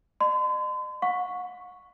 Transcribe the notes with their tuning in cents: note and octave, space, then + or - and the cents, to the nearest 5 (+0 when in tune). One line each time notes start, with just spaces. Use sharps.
D#5 -45 C6 -40
F#5 -40 C#6 +0